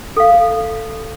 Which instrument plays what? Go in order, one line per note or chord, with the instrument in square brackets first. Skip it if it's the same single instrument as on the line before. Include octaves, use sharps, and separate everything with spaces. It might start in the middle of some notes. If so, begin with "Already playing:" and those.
[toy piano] A4 F5